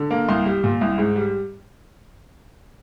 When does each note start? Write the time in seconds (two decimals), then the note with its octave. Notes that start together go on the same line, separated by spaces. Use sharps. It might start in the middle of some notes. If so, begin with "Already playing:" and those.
Already playing: D3
0.11 A#3
0.29 C2 C6
0.46 G3
0.64 A#2
0.81 C2
0.98 G#2
1.16 G3